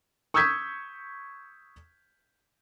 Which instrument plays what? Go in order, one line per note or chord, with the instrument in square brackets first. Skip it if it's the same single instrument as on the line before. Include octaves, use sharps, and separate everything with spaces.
[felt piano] C#6 D#6 E6 G6 G#6 B6